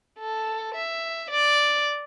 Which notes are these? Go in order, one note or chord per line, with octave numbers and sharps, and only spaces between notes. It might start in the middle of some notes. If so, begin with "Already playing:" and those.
A4
E5
D5